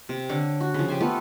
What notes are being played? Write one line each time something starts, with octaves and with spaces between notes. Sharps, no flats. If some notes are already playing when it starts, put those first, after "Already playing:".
C3
D3 C#5 D6
F#4
C#3 F3
G4 C5 G#5
A3 B3 F4